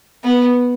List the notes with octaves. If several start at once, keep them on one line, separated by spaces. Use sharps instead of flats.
B3